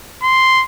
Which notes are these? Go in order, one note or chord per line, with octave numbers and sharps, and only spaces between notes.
C6